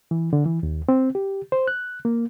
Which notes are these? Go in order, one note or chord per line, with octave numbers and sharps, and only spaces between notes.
E3
D3
E3
D#2
C4
G4
C5
F#6
A#3